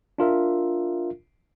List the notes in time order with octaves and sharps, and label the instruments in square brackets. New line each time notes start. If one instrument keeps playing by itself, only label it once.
[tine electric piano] D4 F4 A#4 E5